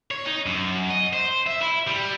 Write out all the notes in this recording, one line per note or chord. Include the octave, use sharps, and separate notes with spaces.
C#5
D#4
F#2
D#5
C5
E5
E4
G3